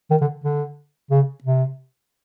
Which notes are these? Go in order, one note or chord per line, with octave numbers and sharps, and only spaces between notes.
D#3
D3
D3
C#3
C3